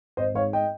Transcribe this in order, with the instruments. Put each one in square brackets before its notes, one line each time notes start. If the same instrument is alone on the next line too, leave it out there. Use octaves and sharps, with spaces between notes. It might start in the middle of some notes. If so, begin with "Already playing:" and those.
[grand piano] G#1 C5 D#5
G#2 C#5 F5
D#5 G5